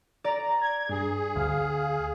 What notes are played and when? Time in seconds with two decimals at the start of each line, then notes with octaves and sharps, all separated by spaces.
0.24 D5 A#5
0.62 G#6
0.89 G2 G#4
1.36 D2 F5